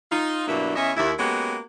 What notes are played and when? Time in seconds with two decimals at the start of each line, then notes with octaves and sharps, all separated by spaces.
0.12 D#4 F4
0.48 G2 B2 F#3 A#3 D4 E4
0.76 E2 E3 C#4 D#5 E5
0.97 D#2 E4
1.19 G#3 A#3 B3 C#4 F#4 G4